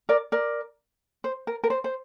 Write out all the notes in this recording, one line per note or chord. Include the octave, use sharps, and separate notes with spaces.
A#4 D5
A#4 D5
C5
A#4
A#4
C5
C5